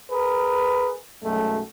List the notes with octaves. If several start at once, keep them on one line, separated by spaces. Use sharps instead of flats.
G#4 A#4 B4
B1 F#2 G#3 A3